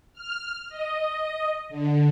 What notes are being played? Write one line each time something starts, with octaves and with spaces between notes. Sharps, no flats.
F6
D#5
D3